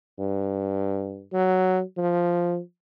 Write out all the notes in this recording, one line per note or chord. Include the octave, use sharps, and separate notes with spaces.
G2
F#3
F3